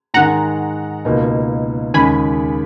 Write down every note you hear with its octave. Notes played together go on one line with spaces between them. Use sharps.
G#2 D#3 G#3 F#5 A#5
C#2 B2 A#3 D#4
D#2 C#3 G#3 C#4 G#5 B5